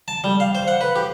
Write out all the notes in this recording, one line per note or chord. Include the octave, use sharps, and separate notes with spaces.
A5
G3
F5
C5
F#5
B4
G4